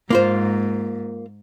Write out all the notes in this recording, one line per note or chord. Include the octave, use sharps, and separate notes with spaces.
G#2 A#3 F4 C5